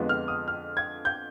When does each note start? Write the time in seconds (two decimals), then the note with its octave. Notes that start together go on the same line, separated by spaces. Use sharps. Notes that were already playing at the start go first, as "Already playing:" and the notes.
Already playing: F2 D3 F3 G#3 B3
0.09 F6
0.28 D#6
0.48 F6
0.77 G#6
1.05 G6